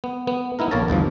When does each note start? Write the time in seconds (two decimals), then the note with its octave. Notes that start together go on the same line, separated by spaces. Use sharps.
0.04 B3
0.27 B3
0.59 B3 D#4 E4 A#4
0.71 A#1 A#3 A#4 C#5 A5 A#5
0.88 G1 E2 G2 F3